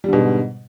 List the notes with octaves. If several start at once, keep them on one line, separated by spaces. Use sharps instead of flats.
G#2 B2 D3 G3